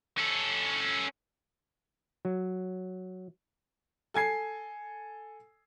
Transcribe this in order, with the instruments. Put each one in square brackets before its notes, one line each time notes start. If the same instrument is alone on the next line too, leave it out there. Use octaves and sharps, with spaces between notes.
[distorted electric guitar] C#4 A4
[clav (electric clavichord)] F#3
[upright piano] A4 G#5 G#6 C7